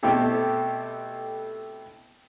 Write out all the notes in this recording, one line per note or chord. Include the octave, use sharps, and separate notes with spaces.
B2 A3 C4 E4 G4 A4